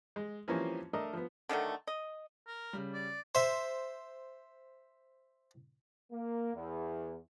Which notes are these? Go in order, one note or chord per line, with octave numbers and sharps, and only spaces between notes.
G#3
E3 F3 G3 A#3 C4 C#4
A3 D4 A#4 D#5
F3 B3
D3 D#3 F#3 A3
D#5
A#4
C#3 G3
D5
C5 E5
A#3
E2